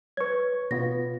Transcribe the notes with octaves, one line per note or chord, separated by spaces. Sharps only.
B4 C#5 C#6 G#6
B2 B3 F4 A#6